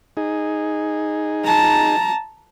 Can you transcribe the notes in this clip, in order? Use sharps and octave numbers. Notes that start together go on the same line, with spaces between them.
D#4 G#4
A5 A#5